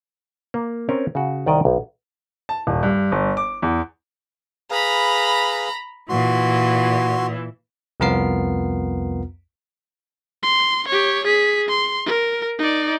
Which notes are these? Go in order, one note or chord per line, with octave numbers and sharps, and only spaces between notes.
A#3
C4 C#4 A#4
C#3 F#4
C2 D#3 D5 D#5
B1
A5
D#1
G2
G1
D6
E2
G#4 B4 F5 A#5 B5
A#2 E3 F#4 C6
C2 F2 B3 F4 A#4 C7
C6
G4 C#5
G#4 B6
C6
A#4
D#4 D5